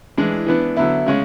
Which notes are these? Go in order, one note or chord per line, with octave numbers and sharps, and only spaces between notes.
E3 G#3 D4
E3 B3 D4
D3 F#3 B3 E4
C#3 G#3 C#4